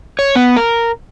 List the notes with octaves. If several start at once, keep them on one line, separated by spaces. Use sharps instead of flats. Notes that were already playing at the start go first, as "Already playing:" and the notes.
C#5
B3
A#4